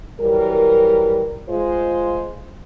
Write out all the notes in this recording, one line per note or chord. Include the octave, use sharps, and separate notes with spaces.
E3 F#3 G3 A#4
G#3 F4 C5